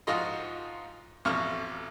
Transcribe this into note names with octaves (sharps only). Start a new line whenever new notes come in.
G#2 F3 F4 F#4 D#5 C6
A1 F2 B2 F3 C#6 F6